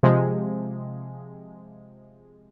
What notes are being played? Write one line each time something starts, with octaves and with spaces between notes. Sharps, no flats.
C3 F3 G#3